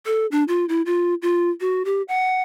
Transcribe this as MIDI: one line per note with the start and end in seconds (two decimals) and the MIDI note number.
0.06 0.26 69
0.32 0.43 62
0.48 0.65 65
0.69 0.82 64
0.86 1.14 65
1.22 1.50 65
1.61 1.83 66
1.85 2.02 67
2.08 2.42 78